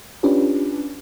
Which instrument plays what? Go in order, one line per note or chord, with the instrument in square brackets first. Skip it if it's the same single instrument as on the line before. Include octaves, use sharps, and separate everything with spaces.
[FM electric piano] C#4 D4 F4 G4 B4